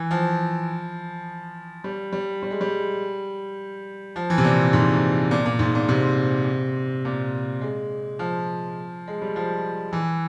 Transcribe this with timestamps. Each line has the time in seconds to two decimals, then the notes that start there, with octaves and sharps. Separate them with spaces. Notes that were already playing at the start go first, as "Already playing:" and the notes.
Already playing: E3
0.11 F3
1.84 G3
2.12 G3
2.43 G3
2.51 G#3
2.61 G3
4.16 F3
4.30 E3
4.38 C3
4.44 A#2
4.73 G#2
5.31 A#2
5.46 A#2
5.59 G#2
5.75 A#2
5.89 C3
7.05 A#2
7.61 G#3
8.19 F3
9.08 G#3
9.22 G3
9.36 F3
9.93 E3